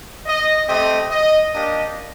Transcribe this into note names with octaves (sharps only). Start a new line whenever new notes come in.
D#5
A3 C4 G4 D#5
D#5
A#3 D4 G4 D#5